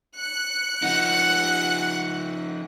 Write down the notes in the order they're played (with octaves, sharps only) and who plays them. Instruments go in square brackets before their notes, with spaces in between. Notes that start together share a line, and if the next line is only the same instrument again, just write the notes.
[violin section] F#6 C#7
[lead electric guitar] F3 D#4 [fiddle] F#5